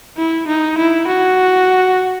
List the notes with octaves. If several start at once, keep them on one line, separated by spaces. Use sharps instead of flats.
E4
D#4
E4
F#4